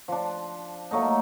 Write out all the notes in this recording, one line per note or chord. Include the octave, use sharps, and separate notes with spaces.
F3 D4
F#3 A3 A#3 D#4